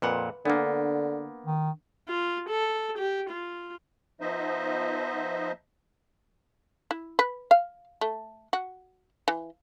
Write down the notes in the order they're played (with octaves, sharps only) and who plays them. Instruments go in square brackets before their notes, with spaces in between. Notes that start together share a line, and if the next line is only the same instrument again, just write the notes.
[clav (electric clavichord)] F2 A#2 F#5 [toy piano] B4 B5
[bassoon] D3 [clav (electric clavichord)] A#3 B3 [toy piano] D4 A#4
[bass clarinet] D#3
[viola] F4
A4
G4
F4
[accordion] F3 B3 D#4 C5 D#5 E5
[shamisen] E4
B4
F5
A3
F#4
E3